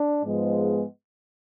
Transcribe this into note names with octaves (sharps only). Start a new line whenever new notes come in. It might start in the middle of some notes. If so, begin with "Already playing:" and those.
Already playing: D4
G#2 F3 G#3 B3